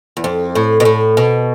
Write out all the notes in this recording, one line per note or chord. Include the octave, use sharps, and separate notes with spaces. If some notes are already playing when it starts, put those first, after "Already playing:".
E2
F2
A2
B2
A2
B2